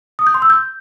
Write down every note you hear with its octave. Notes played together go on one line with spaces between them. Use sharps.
D#6
G6
C6
E6
G6